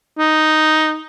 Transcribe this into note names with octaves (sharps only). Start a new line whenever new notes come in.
D#4